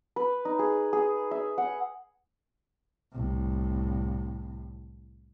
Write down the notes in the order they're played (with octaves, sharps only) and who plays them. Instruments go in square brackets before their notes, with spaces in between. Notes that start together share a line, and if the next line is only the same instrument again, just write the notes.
[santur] B4
D#4
G#4
G#4
E5
F#5
[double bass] C2 A2